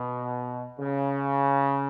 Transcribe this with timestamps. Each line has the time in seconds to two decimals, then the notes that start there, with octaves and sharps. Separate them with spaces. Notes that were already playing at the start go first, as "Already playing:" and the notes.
Already playing: B2
0.79 C#3